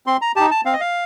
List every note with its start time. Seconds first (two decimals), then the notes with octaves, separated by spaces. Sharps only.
0.06 C4 C6
0.22 A#5
0.36 D#4 G4 A5
0.51 A5
0.65 C4 F5
0.73 D#5
0.81 F5